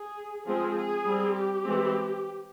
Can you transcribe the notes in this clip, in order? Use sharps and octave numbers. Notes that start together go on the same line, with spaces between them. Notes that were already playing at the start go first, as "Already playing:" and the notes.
Already playing: G#4
F3 G#3 C4 G#4
G#4
G3 C4
G4
E3 G#3 C4